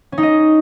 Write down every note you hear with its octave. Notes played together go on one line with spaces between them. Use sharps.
C#4
D#4
D#5